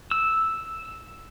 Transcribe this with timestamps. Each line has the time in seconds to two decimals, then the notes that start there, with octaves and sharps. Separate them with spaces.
0.11 E6